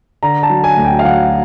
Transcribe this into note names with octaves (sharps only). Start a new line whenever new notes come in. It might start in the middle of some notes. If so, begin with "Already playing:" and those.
D3 A#5
A5
F#3
G#5
D2
G5
F5
F#3 F#5